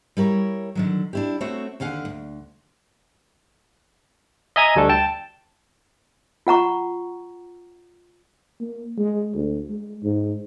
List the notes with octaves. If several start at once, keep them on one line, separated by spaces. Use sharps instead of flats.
G3 E4 A#4 C#5
D3 D#3 F#3
D4 E4 G4
A3 C4 F#4 C#5 E5
D#2 D3 F5 F#5 G#5
D2
D#5 E5 G#5 A#5 D#6 G#6
D2 G3 A3 D4 A4
G5 A5
F4 F#5 A#5 C#6
A#3
G#3
D2
G#3
G#2